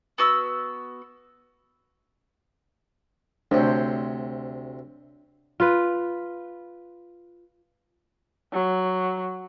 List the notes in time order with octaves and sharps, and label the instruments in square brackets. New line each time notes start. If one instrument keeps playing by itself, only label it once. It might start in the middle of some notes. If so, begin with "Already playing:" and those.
[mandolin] B3 F#4 E6
[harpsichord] D2 C3 [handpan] D4 C5 C#5
[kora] F4 B4
[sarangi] F#3